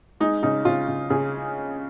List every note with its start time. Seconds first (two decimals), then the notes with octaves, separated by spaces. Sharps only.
0.20 G#3 D#4
0.43 C#3 D#4
0.65 C#3 F4
0.88 C#3
1.10 C#3 G#4